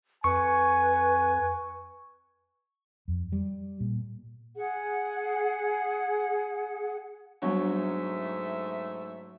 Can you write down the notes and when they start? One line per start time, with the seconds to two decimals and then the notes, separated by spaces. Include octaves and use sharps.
0.24 F2 B4 G#5 C#6
3.08 F2
3.32 G3
3.80 A#2
4.56 G#4 F#5
7.42 G#2 F#3 G3 A3 B3 C#4 D4 E5